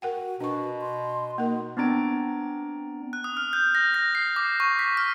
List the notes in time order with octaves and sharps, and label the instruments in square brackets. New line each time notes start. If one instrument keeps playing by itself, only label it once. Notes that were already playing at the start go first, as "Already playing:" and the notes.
[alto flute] F#4 [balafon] A#4 F#5 G5
[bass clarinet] B2 [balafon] D4 C#6 [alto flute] B4
[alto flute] C6
[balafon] A#3 A#4 [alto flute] D#4
[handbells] B3 C4 D4 A#5 A6 D7
[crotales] F#6
D#6
F6
G6
A#6
A#6
C7
D6
C#6
B6
F6